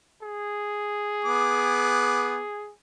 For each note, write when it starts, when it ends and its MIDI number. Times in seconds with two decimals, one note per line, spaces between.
0.22 2.72 68
1.25 2.41 59
1.25 2.41 86